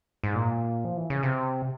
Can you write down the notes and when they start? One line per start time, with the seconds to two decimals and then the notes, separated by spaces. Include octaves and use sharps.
0.24 G#2
0.35 A#2
0.85 F3
0.97 E3
1.10 C#3
1.23 C3